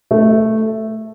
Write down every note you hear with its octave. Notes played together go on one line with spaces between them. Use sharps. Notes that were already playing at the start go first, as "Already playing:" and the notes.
A3